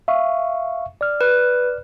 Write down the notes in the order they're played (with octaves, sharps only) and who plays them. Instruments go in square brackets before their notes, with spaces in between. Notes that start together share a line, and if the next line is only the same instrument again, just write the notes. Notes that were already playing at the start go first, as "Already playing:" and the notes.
[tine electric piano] E5 F5 C#6
D5 F6
[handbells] B4